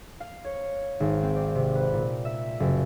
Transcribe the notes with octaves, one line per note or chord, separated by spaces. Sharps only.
F5
C#5
G#1
C4
D5
C3
B4
A#2
E5
F#1